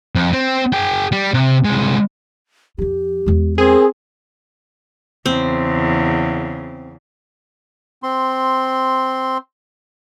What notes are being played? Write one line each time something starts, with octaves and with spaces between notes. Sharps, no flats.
F2
C4
G#4 G5
G3
C3
C2 G#3
F2 F3 G4
E2 G#3
C4 G#4 A#4
E2 C#3 C4
C4 C6